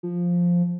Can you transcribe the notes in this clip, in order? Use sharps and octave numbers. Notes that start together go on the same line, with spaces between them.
F3